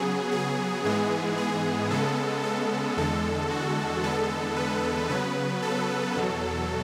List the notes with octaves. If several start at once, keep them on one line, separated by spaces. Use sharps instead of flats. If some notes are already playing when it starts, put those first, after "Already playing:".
Already playing: C#3 F#3 B3 G#4
G#4
G#2 E3 G#3 B3 G#4
G#4
C#3 G#3 B3 A4
A4
E2 D3 G#3 A4
F#4
E2 D3 G#3 B3 A4
B4
C#3 F#3 B3 B4
A4
E2 B2 F#3